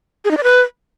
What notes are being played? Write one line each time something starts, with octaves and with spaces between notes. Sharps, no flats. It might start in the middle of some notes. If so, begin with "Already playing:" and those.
G#4
D#4
D5
B4